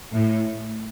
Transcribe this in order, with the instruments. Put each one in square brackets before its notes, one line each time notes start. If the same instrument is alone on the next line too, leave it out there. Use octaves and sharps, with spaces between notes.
[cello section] A2